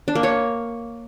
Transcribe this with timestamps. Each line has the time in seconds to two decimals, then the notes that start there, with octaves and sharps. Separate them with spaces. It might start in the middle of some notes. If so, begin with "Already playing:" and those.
0.08 D4
0.15 A#3
0.23 C#5